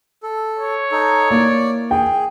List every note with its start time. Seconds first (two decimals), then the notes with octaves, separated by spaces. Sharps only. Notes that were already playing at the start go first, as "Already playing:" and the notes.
0.23 A4
0.59 C#5
0.92 D#4 A4
1.31 A#3 E4 D5
1.91 G#4 G5